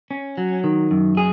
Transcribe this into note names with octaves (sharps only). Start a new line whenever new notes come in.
C#4
F#3
D#3
F#2
G#4